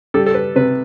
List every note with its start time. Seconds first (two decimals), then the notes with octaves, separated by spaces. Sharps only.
0.14 G3 A4
0.26 A4
0.34 B4
0.55 C3 B4